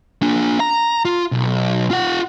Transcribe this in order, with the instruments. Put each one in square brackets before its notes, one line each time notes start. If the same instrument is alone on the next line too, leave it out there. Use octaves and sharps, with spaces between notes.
[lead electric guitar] A#3 D4
A#5
F4
B1
F4 F#5